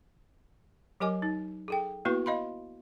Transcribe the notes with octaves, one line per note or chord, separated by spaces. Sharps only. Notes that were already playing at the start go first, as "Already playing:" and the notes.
F#3 G4 A#4 D#5 G#5 D6
D#4
G#4 A4 G5
A#3 B3 E4 F#4 B4 C#6
D#5 F5 B5 C6